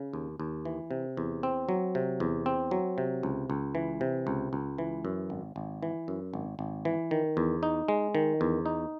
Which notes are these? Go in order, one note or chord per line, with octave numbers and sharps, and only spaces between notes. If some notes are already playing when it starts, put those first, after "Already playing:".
Already playing: C#3
D#2
D#2
E3
C3
E2
C4
F#3
C3
E2
C4
F#3
C3
C#2
C#2
E3
C3
C#2
C#2
E3
F#2
G#1
G#1
E3
F#2
G#1
G#1
E3
D#3
E2
D#4
G#3
D#3
E2
D#4